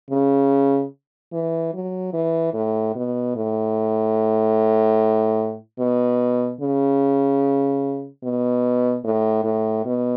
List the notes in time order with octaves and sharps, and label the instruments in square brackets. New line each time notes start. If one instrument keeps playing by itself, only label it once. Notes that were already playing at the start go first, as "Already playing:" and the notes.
[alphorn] C#3
E3
F#3
E3
A2
B2
A2
B2
C#3
B2
A2
A2
B2